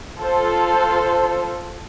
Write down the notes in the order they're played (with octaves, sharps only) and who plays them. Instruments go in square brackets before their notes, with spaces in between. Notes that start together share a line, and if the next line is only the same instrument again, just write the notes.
[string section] F4 A4 C5